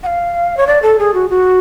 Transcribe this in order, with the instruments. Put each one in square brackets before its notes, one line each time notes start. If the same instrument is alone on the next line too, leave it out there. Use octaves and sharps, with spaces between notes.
[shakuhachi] F#5
F5
C#5
D5
A4
G#4
F#4
F#4